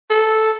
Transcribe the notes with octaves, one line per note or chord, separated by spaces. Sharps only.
A4